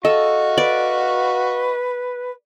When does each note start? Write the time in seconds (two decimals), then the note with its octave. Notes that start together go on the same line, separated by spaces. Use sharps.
0.05 F#4 A4 D#5 F5 C#6
0.58 B4 D5